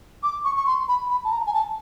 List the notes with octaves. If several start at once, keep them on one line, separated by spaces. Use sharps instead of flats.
D6
C#6
C#6
C6
B5
B5
A5
A#5
G#5
A5